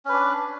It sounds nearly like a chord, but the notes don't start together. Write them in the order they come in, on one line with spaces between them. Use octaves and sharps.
C#4 B4 D4